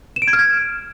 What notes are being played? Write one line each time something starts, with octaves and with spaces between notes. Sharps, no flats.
E7
D7
G#6
F6
G#6